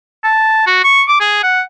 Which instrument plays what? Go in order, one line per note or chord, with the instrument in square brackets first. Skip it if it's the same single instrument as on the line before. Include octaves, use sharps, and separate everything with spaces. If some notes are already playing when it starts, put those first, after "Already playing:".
[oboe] A5
F#4
C#6
D6
G#4
F#5